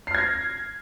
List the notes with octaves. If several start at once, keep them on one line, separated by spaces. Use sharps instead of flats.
F6 G#6 A#6 C7